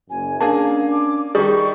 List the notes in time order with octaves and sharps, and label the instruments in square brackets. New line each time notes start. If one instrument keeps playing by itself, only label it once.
[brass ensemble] F#1 F#2 [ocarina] G#5
[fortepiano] A#3 G#4 G#5 [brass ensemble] C#4 D4 [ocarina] F5 [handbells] A5
[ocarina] D6
[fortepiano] D#3 G3 [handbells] G#4 [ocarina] C#6